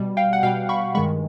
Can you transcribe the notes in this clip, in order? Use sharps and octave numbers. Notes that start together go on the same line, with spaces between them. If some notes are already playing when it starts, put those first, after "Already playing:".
Already playing: B2 G3
F5 G5
F#5
B2 G3 F5 G5
B5 C#6
G2 D#3 G#3 B5 C#6